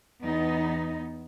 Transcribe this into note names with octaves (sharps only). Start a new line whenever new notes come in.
E2 B3 D#4